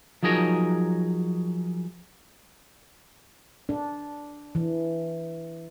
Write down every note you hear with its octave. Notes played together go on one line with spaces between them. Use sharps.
F3 F#3 D#4 G#4 A#4 C#5
D4
E3